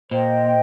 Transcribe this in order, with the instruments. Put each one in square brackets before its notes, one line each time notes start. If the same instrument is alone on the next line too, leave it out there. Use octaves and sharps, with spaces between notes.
[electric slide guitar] A#2 [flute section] C5 D#5 G5